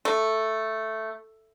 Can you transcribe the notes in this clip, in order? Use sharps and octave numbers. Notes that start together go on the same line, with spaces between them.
A3